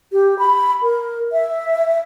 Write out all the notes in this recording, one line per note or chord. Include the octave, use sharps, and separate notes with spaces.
G4
B5
A#4
E5